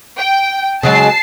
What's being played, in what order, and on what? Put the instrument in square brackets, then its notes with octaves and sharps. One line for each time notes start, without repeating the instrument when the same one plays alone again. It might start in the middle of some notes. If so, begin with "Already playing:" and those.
[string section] G5
[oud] C#3 F#3 G#3 [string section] A5 C7